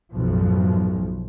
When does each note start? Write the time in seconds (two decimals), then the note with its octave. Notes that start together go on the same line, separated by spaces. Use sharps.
0.12 B1 F#2 A2 F3